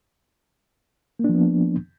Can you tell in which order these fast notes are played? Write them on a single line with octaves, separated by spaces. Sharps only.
A#3 D4 F3 B3